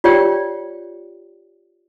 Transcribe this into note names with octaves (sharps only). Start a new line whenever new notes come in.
F4 G4 C#5 D5 G5